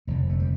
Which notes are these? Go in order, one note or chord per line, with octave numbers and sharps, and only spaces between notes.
F1 F2 D3 A3
A3
G3